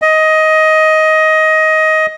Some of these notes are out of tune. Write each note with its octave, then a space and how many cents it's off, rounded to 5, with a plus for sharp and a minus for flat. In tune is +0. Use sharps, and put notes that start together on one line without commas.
D#5 +15